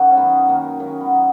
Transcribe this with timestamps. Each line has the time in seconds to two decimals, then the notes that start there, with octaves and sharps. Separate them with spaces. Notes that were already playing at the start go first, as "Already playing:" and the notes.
Already playing: F#2 D#4 F#4
0.11 C#4
0.17 D#3 B3
0.48 D#3 A#3
0.79 D#3 A#3 C#4
1.00 B3 D#4